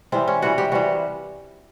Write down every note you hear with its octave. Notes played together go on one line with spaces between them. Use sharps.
C3 E3 G3 C4
C#4
C3 E3 G3 F#4
G4
C3 E3 G3 F#4